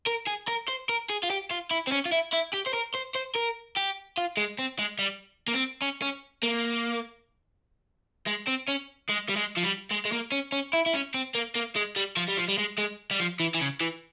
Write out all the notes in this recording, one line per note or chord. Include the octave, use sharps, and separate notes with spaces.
A#4
G#4
A#4
C5
A#4
G#4
F4
G4
F4
E4
C4
C#4
F4
E4
E4
G4
C5
A#4
C5
C5
A#4
G4
F4
G#3
C4
G#3
G3
A#3
C4
C#4
C#4
A#3
G#3
C4
C#4
G#3
G3
G#3
F3
G3
G#3
G#3
A#3
C#4
C#4
E4
E4
C#4
C4
A#3
A#3
G#3
G3
F3
G3
F3
G3
G#3
G#3
G3
F3
E3
E3
C#3
E3